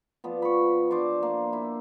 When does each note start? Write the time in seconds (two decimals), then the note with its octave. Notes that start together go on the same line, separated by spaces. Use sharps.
0.24 F3 B3 D5
0.42 B5 C#6
0.91 D4 C5 D5 D6
1.23 A#3 F5
1.53 E4